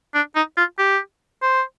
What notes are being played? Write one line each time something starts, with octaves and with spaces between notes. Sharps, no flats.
D4
D#4
F4
G4
C5